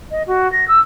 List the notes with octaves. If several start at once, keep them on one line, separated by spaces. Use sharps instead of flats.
D#5
F#4
A#6
E6